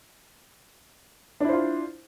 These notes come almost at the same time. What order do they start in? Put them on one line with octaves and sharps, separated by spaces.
D4 E4 C5 F4